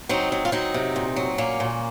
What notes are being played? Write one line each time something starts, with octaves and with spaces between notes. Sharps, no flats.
F#3 C4 D#4
F#3
F4
F#3 C4 D#4
C3
A#2
F#3
A#2 A#3 C#4
A#2